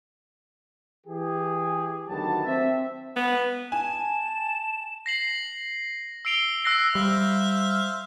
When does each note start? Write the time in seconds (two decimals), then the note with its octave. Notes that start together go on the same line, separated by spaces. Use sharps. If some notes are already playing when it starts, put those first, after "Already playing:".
1.07 E3 G4 G#4
2.09 D2 D#3 F#3 B3 G4 A5
2.45 C4 E5
3.16 B3
3.72 G#5 A5 E7
5.06 A#6 C7 F#7
6.25 E6 C7 D7 F7 G7
6.64 E6 F#6 A#6 C7
6.95 G3 C5 E5 F5